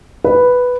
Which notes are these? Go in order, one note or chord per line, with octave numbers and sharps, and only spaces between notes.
B4